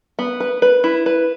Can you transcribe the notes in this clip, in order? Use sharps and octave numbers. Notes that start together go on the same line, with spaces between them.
B3
B4
B4
E4
B4